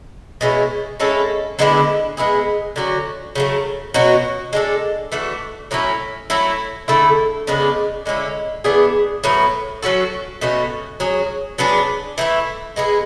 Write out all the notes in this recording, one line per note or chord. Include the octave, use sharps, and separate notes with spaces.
B2 G#3 C#4 E4
G#3 C#4 E4 A4
D3 G#3 B3 E4
G#3 B3 E4 G#4
D3 F#3 C#4 F#4
C#3 F#3 A3
B2 F#3 C#4 F#4
G#3 D4 A4
E3 A3 D4 F#4
A2 F#3 C#4 E4
F#3 A3 E4
D3 A3 E4 A4
C#3 G#3 B3 D4
D3 G#3 C#4 E4
E3 B3 D4 G#4
A2 F#3 B3
F#3 C#4 F#4 A4
B2 A3 C#4 F#4
F#3 C#4 G#4
F#3 B3 D4 G#4
E3 A3 E4
G#3 B3 E4 G#4